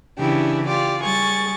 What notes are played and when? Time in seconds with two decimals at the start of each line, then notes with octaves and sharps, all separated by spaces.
0.18 C#3 E3 D4 E4 G4
0.67 F4 G4 D5
1.01 G3 G#4 C#6 A6